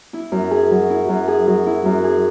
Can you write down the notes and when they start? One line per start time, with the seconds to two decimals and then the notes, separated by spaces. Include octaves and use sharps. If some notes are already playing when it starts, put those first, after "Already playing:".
0.13 E4
0.32 F#2
0.51 G#4
0.71 F#3
0.90 E4
1.09 F#2
1.28 G#4
1.47 F#3
1.66 E4
1.85 F#2
2.04 G#4